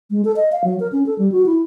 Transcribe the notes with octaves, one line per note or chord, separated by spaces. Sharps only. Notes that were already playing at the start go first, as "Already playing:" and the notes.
G#3
A4
D#5
F5
F#3
A#4
C#4
A4
G3
F#4
E4